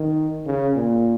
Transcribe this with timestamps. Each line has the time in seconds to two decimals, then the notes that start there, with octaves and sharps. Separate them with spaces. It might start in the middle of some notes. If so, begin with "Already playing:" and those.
Already playing: D#3
0.46 C#3
0.75 A#2